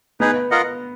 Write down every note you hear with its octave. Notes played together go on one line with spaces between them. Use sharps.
B3 D#4 G#4 B4
F4 A#4 D#5 F#5